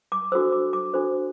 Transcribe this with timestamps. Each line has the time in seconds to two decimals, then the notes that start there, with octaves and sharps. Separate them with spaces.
0.12 D6
0.32 D4 F#4 A4 C5 E6
0.52 D6
0.73 D6
0.94 D4 F#4 A4 C5